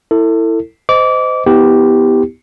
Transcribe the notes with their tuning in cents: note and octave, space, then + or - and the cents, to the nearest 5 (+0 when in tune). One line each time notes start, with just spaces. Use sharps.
E4 +0 A4 +30
C5 -30 D#5 +0 D6 -25
B3 +0 E4 -40 G4 +0